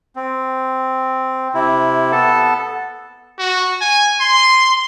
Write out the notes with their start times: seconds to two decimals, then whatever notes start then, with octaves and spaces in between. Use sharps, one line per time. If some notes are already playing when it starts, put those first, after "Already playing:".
0.16 C4
1.54 C3 E4
2.12 B3 A4 A5
3.38 F#4
3.81 G#5
4.20 C6